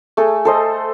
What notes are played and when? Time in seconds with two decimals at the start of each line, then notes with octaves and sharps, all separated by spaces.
0.17 A3 G#4 A4
0.45 A4 C5 D#5